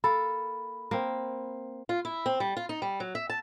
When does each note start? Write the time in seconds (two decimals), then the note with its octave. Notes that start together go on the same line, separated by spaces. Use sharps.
0.04 A#3 A4 B5
0.91 A#3 C4
1.89 F4
2.05 E4
2.26 C4
2.40 G3
2.57 F4
2.69 D#4
2.82 G3
3.00 F#3
3.15 E5
3.30 A5